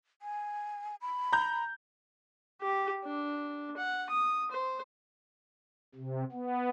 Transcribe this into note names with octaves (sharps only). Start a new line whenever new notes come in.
G#5
B5
A#5 G6
G4
D4
F#5
D#6
C5
C3
B3